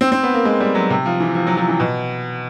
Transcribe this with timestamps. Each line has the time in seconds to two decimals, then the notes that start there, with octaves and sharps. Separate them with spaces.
0.01 C4
0.12 C4
0.23 B3
0.34 A#3
0.45 G#3
0.60 G3
0.75 F#3
0.90 C3
1.06 F3
1.20 E3
1.35 F3
1.47 F#3
1.57 F3
1.68 E3
1.80 B2